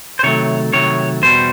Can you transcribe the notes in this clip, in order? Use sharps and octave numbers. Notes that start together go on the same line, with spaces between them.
C5
C3 D#3 F#3 A3 C#5
C3 D#3 F#3 A3 C#5
E2 B2 G3 C5